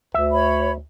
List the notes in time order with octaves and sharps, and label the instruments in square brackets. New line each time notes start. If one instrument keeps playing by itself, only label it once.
[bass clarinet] D2 [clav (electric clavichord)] E5
[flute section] C#5 B5